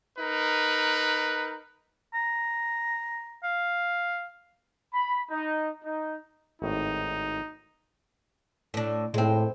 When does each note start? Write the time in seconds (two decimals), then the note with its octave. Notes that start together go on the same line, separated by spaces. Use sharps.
0.18 D#4 A#4 B4
2.14 A#5
3.44 F5
4.91 B5
5.29 D#4
5.83 D#4
6.62 G#1 A2 D#4
8.74 A2 D4
9.14 A2 G#3 C4